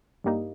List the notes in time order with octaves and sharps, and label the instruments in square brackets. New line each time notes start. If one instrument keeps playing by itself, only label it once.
[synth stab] G2 G3 A#3 D#4